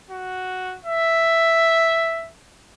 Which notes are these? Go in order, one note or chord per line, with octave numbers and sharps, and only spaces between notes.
F#4
E5